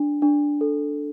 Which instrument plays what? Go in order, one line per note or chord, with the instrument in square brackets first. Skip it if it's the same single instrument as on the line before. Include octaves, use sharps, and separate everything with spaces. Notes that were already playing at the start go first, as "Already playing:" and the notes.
Already playing: [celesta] D4
D4
A4